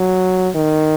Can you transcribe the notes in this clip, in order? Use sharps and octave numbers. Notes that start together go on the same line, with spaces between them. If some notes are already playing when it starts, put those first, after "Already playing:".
Already playing: F#3
D#3